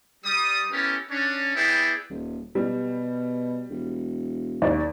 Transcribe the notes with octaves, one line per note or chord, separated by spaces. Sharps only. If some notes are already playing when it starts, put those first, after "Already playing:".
G3 D#6
B3 C#4 E4 G4 A4 A#4
C#4 D4 C#5
B3 E4 G#4 D5 G5
D#1
B2 G3
E1
D#2 D5